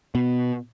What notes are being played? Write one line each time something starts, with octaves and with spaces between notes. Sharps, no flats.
B2